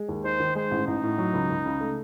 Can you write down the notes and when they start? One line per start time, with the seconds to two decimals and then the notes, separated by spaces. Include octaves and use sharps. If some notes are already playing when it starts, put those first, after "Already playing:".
Already playing: G#3
0.08 D#2
0.24 D#4 C5
0.40 D#3
0.55 G#3 C5
0.71 A1
0.87 A1 D#4
1.03 A2
1.18 F#3
1.33 C#2
1.50 C#2
1.65 C#3
1.81 A3